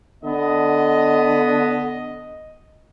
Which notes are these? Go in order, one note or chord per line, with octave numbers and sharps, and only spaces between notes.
D3 B3 D#5